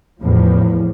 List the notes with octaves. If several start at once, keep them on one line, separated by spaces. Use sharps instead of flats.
E2 A2 F3